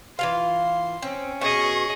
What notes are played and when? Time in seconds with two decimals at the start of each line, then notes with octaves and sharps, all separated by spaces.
0.19 E3 F4 F5 C6
1.02 C4 C#4
1.41 B2 G#4 D#5 C#6